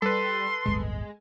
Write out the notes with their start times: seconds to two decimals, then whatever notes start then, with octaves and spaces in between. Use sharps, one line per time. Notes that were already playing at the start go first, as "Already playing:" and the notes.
0.02 G3 A4 B4 C6
0.66 D1 G1 G#3